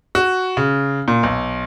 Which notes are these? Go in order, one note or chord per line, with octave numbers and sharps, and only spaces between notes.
F#4
C#3
A#2
B1